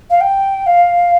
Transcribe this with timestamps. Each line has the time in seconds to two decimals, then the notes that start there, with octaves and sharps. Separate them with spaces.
0.10 F5
0.20 G5
0.66 F5